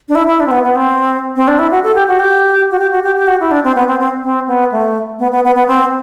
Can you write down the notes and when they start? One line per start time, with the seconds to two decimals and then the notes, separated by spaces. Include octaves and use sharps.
0.09 D4
0.15 E4
0.27 E4
0.40 D4
0.46 C4
0.51 B3
0.64 B3
0.75 C4
1.36 C4
1.48 D4
1.59 E4
1.71 F#4
1.83 A4
1.95 G4
2.08 F#4
2.19 G4
2.71 F#4
2.79 G4
2.91 F#4
3.03 G4
3.16 G4
3.27 F#4
3.40 E4
3.51 D4
3.64 C4
3.76 B3
3.87 C4
4.00 C4
4.23 C4
4.48 B3
4.72 A3
5.19 B3
5.32 B3
5.44 B3
5.55 B3
5.67 C4